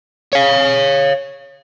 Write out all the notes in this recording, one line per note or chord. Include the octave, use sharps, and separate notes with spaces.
C#5 F5